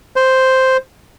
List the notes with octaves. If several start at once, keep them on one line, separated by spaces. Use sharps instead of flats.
C5